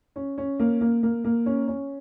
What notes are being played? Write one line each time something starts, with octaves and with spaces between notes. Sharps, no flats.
C#4
C#4
A#3
A#3
A#3
A#3
C#4
C#4